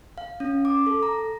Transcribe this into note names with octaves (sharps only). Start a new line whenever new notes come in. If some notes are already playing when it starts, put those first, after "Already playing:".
F5
C#4
D6
A4
A#5